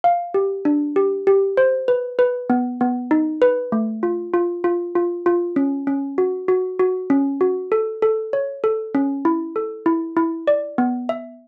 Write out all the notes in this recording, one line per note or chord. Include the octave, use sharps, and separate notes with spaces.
F5
G4
D4
G4
G4
C5
B4
B4
B3
B3
D#4
B4
A3
F4
F4
F4
F4
F4
C#4
C#4
F#4
F#4
F#4
C#4
F#4
A4
A4
C#5
A4
C#4
E4
A4
E4
E4
D5
B3
E5